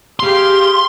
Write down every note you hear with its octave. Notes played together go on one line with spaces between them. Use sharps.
G4 G#4 F5 C6